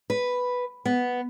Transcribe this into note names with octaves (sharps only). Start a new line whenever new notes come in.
B4
B3